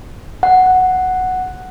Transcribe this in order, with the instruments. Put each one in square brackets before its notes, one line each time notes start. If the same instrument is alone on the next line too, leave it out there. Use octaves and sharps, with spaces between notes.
[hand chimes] F#5